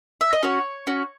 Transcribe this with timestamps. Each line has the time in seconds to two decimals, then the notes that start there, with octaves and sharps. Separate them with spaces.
0.21 E5
0.33 D#5
0.43 C#4 F#4 C#5
0.87 C#4 F#4